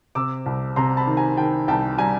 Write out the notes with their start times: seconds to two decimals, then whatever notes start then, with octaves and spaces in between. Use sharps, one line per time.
0.15 C3 D6 E6
0.46 C2
0.76 C3 A#5 C6
0.97 A5 B5
1.07 D#3
1.17 G#5 A#5
1.37 D#3 G5 A5
1.68 C2 G5 A5
1.98 G3 G#5 A#5